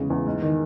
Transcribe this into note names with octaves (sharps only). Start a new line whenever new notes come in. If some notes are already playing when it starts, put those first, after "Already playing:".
Already playing: E2 C#3 G#3
E2
G#2
D#3